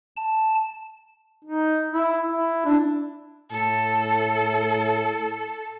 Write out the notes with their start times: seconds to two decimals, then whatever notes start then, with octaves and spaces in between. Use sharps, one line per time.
0.17 A5
1.44 D#4
1.92 E4
2.28 E4
2.65 D4
3.52 A2 A4